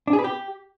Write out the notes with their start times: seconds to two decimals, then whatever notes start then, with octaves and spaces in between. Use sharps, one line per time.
0.07 D4
0.13 G#4
0.19 B4
0.24 G4